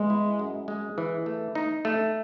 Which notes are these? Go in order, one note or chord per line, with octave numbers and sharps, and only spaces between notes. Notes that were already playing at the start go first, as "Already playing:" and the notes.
Already playing: G#3 B3
E4
F#2
G#3
E3
A3
D#4
A3